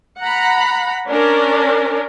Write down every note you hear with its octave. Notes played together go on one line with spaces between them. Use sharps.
F#5 A#5 B5
C#4 D4 A#4